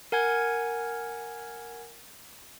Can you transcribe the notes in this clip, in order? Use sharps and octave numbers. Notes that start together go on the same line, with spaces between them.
A#4 F#5 G#5 G#6